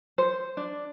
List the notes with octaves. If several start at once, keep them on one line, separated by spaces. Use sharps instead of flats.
C5
D4